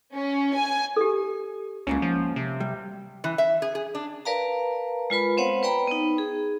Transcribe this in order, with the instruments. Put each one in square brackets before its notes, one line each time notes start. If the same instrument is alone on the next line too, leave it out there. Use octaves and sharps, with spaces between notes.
[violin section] C#4
G#5
[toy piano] G4 A4
[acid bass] C#2 [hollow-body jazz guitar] G#2 A#3 C#4
[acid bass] F3
C3
[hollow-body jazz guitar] G3
[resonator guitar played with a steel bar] E3
E5
G#4
G#4
D4
[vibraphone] A#4 B4 D5 F5 A5 A#5
G#3 F4 B4 B5
B3 C4 C5 C#5 F5 F#5
B4 D5 G5 A#5 B5
B3 D#4
G#4